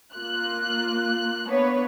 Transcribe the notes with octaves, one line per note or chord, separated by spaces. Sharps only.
A#3 F4 F#6
A#3 B3 D4 B4 C#5